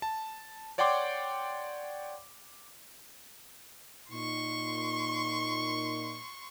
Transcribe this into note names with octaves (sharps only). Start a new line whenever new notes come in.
A5
C#5 D5 F#5 G5 C6 D6
A#2 D#4 C6 C#6